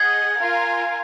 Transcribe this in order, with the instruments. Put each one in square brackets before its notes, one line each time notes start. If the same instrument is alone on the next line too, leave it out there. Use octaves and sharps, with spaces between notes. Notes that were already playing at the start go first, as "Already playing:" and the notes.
Already playing: [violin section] G#4 D#5 F#5 [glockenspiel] G#6
[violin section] F4 A#4 F5 G#5